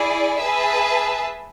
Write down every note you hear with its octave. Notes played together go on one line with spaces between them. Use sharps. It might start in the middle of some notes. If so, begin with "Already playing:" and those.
Already playing: E4 G#4 D5
G#4 B4 E5 A5